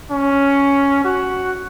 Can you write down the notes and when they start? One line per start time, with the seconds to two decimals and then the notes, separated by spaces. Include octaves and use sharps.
0.11 C#4
1.04 F#4